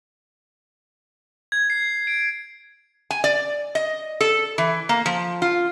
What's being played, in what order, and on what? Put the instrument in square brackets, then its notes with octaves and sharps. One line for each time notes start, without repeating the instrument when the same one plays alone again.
[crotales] G#6
C7
D7
[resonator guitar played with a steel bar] G#5
D5
D#5
A4
E3
A#3
F3
F4